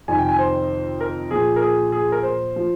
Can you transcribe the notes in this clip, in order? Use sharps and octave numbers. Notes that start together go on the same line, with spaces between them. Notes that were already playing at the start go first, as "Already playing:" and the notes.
F2 C3 D#3 G#5
G5
G#5
C5
A#4
A#2 F3 G#4
A#4
G#4
G#4
A#4
C5
F3